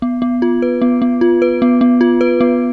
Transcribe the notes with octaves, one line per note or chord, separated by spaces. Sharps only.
B3
B3
F4
B4
B3
B3
F4
B4
B3
B3
F4
B4
B3